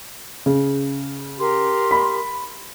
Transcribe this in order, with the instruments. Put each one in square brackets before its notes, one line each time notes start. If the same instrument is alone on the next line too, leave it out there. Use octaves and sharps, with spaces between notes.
[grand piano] C#3
[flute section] G4 A#4 C6
[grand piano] B5